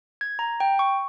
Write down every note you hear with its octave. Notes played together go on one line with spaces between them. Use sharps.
G#6
A#5
G5
C#6